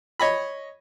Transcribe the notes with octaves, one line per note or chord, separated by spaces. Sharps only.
C#5 D#5 B5